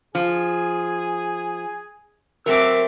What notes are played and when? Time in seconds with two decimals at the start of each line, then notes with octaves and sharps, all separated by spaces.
0.15 F3 G#4
2.46 F#3 A3 C4 A#4 E5 D6 E6